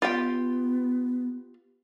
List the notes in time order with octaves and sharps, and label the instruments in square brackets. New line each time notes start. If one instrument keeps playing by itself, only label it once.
[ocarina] B3 [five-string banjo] F4 G4 G5